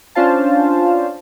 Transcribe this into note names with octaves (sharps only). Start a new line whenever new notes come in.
C#4 D4 F4 C5 F5 A5